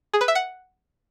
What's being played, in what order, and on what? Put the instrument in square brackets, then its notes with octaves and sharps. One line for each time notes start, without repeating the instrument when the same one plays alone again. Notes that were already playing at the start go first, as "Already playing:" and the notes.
[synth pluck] G#4
B4
E5
F#5